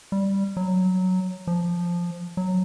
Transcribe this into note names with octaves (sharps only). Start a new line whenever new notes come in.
G3
F#3
F3
F#3